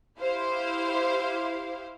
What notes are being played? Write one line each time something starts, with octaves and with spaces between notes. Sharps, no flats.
E4 G4 C5 F5